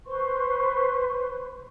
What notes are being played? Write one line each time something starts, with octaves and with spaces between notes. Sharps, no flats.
B4 C5 C6 C#6